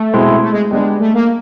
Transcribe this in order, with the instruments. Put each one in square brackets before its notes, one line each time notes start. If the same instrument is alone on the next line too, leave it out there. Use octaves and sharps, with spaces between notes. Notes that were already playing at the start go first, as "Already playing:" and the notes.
Already playing: [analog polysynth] A3
[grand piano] B2 G#3 C4 E4
[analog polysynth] A3
G#3
[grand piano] G3 B3 D4 G4 [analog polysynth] G#3
[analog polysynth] A3
A#3